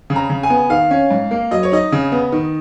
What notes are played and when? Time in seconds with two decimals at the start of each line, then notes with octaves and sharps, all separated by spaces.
0.10 C#3
0.16 A#5
0.30 C#3
0.43 G#5
0.50 B3
0.70 D#3 F5
0.91 C#4
1.10 G#2
1.31 A#3
1.51 F#3 D#5
1.63 C#5
1.72 D#4 D#5
1.92 C#3
2.12 B3
2.32 D#3